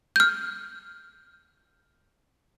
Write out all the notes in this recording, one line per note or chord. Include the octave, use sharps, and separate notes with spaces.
F6 G6